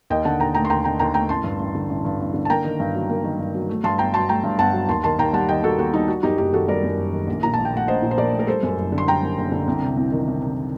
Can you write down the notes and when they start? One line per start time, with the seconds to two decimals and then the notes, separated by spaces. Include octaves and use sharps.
0.10 D#2 D#5 G5
0.25 D3 F#5 A5
0.40 D#2 G5 A#5
0.55 A3 G5 A#5
0.65 C6
0.70 D#2 G5 A#5
0.84 D3 G5 A#5
0.99 D#2 G5 A#5
1.14 A3 G5 A#5
1.29 A1 A5 C6
1.44 G2
1.60 A1
1.75 D3
1.89 A1
2.05 G2
2.20 A1
2.34 D3
2.45 A5
2.50 A#3 G5 A#5
2.65 D#3
2.80 G2
2.94 F#3
3.09 A#3
3.24 D#3
3.39 G2
3.54 F#3
3.69 A3
3.84 G2 A5 C6
3.98 G1 G5 A#5
4.14 F#3 A5 C6
4.29 A3 G5 A#5
4.44 G2
4.58 G1 F#5 A5
4.73 F#3
4.88 D#2 A5 C6
5.04 D#3 A5 C6
5.18 D#2 G5 A#5
5.33 G3 F#5 A5
5.49 D#2 D#5 G5
5.63 D#3 F#4 A4
5.78 D#2 F#4
5.93 G3 D#4
6.08 G3 F#4
6.23 F#2 D#4 G4
6.38 F#1 D#4 G4
6.53 D#3 F#4 A4
6.68 G3 A#4 D5
6.83 F#2
6.98 F#1
7.12 D#3
7.27 A#1
7.43 A#2 A#5
7.54 A#1 A5
7.65 G5
7.72 A3 F#5
7.88 A#1 C5 D#5
8.02 A#2
8.11 C5
8.18 A#1 A#4 D5
8.32 A3
8.39 A#4
8.47 G3 A4 C5
8.63 F#2
8.77 F#1
8.92 D3
8.98 C6
9.07 G3 G5 A#5
9.22 F#2
9.38 F#1
9.52 D3
9.68 C2
9.82 C3
9.97 C2
10.12 D#3
10.28 C2
10.42 C3